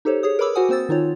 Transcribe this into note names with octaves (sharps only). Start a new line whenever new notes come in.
D#4 G4 A4 C5 C#5
G#4 C#5 D#6
A#4 B4 C#5 B5 D6 E6
F#4 C5 F#5 G#5 D#6
A#3 C4 C5 E6 A6
D#3 D#4 F4 C#5